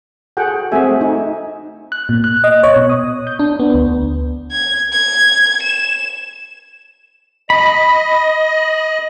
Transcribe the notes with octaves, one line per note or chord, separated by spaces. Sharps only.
F#4 G#4 A4 F#5 G5
A3 C4 F#4 G#4 E5 G#5
D#4
F#6
A#2
F#6
D#5
C#5
B2
D#6
G6
D4
B3
D2
G#6
G#6
E7
D#5 B5